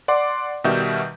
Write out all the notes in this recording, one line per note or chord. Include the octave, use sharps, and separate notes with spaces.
D5 F#5 C6 D6
B2 D#3 G3 F#4 E5 G6